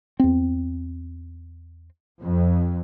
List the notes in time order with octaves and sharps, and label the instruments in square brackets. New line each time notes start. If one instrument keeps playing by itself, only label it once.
[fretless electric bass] E2 C4
[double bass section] F2